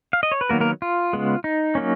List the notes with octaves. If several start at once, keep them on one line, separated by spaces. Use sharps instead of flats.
F5
D#5
C#5
B4
D#3 F#3 A#3 B3 A#4
A#3 A#4
F4
C#3 G#3 B3
D#4
F#3 A#3 C#4